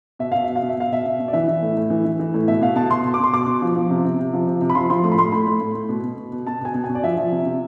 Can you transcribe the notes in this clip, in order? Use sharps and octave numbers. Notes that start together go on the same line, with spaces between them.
B2 E5
B2 F5
B2 E5
F5
B2
E5
B2 F5
B2 E5
B2
B2
D5
E3 E5
E3
A2
A2
E3
E3
E3
A2
B2 E5
B2 F5
B2 A5
B2 C6
B2
D6
B2 C6
B2 D6
B2
F3
F3
C3
C3
C3
F3
C3
C3
B5
F3 C6
F3 C6
A2 C6
B5
A2 C6
A2 B5
A2
A2
A2
B2
B2
B2
B2
B2 A5
B2 G#5
B2
G#5
B2
D5
F3 E5
F3
C3
C3